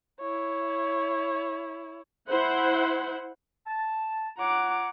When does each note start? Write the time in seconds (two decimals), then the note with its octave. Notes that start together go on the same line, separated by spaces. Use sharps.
0.20 E4 C#5
2.29 E4 C5 F#5
3.67 A5
4.38 F4 C#5 F#5 A#5 D6